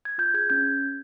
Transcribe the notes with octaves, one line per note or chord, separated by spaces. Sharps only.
G#6
F4 G6
G#4 G#6
C#4 G6